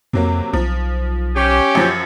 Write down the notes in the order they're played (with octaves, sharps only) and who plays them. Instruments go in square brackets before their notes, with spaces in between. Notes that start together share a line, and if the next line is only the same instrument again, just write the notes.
[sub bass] F2 [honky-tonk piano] C3 F#3 A#3
[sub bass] B1 [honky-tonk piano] F3
[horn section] C#4 G4
[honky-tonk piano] F#2 F3